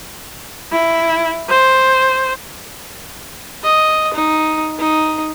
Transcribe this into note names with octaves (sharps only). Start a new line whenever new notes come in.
E4
C5
D#5
D#4
D#4